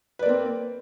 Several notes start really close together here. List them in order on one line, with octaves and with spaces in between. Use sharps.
B4 D5 A#3 C4